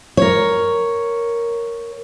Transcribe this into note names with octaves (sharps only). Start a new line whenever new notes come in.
A#4 C#5